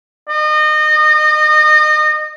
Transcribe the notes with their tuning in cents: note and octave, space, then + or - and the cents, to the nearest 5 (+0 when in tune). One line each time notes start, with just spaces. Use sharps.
D#5 -30